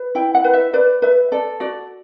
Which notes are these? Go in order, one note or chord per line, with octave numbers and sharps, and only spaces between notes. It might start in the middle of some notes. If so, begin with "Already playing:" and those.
Already playing: B4
E4 G5
F#5
B4
E5
B4 D5
B4 E5
A4 D5
F#4 D5